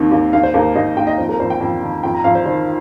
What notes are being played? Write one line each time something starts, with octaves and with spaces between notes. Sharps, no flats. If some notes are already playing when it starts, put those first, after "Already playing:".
Already playing: D#2 D#3 C4
D#2
D#2 F5
C5
D#2 A#4
D#2 D#5
D#2 G5
D#5
F2 C5
A#4
F2 C5
G5
F2 G5
D#3
F2 G5
A#5
F2 F5
C5
D#3 C5